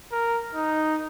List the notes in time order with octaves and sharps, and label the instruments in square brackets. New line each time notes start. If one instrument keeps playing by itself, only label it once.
[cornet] A#4
D#4